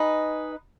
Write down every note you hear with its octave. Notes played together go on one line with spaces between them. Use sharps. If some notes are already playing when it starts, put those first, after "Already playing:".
Already playing: D#4 G#4 B4 D#5